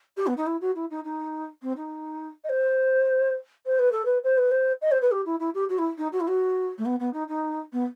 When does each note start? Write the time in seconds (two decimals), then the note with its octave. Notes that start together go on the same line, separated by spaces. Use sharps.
0.16 G4
0.26 B3
0.37 D#4
0.46 E4
0.61 F#4
0.75 E4
0.90 D#4
1.04 D#4
1.62 C4
1.76 D#4
2.44 D#5
2.49 C5
3.66 C5
3.79 B4
3.91 A4
4.05 B4
4.23 C5
4.37 B4
4.51 C5
4.81 D#5
4.91 C5
5.01 B4
5.11 G4
5.25 E4
5.39 E4
5.54 G4
5.69 F#4
5.78 E4
5.97 D#4
6.12 F#4
6.20 E4
6.27 F#4
6.77 A3
6.85 B3
6.99 B3
7.13 D#4
7.28 D#4
7.72 B3